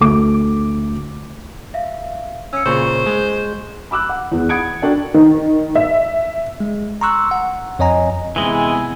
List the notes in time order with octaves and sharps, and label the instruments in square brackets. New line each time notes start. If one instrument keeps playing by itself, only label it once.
[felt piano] D2 A4 D6
[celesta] E5 F5
[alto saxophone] C#4 [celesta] E6 C#7
[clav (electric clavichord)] A#2 C#3 [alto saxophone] C5 [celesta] C#6
[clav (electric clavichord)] G#3
[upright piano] B5 D6 E6 F#6
F#5
E2 E3 B3 G#4
F#5 B5 D#6 G#6 C#7 D7
D4 F#4 A4 A#4 D5 G5
[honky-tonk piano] D#3
E5
[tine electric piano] G#3
A#5 C6 C#6 E6 F#6
F#5
F2 C#5 D#5 G#5 A#5
[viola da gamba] C3 B3 [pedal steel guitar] E3 G#3 [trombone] E4 [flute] G#5